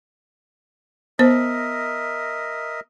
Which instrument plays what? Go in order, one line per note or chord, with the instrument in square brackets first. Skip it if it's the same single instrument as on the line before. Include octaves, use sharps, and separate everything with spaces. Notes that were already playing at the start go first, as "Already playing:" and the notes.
[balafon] B3 C5 [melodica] A#4 D#5 E5